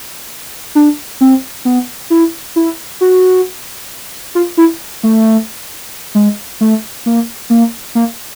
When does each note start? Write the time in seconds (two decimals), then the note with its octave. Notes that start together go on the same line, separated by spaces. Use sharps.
0.75 D4
1.21 C4
1.65 B3
2.10 E4
2.56 E4
3.01 F#4
4.35 F4
4.57 E4
5.03 A3
6.15 G#3
6.61 A3
7.06 A#3
7.50 A#3
7.95 A#3